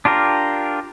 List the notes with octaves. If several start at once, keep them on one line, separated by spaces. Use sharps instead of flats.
D4 F4 G4 A#4